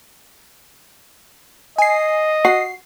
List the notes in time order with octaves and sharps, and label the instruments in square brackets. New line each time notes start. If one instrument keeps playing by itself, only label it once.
[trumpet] D#5 [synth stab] G#5 C7
[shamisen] F#4 [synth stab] C7